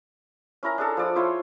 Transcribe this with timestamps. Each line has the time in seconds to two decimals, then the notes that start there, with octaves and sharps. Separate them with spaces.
0.63 C#4 E4 A#4 A#5
0.78 D4 G#4 A4
0.97 F3 D5 D#6
1.16 E4 F4 C5 C#5